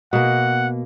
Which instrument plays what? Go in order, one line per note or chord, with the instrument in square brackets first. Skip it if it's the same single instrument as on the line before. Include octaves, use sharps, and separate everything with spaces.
[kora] B2 A#3 [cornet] F#5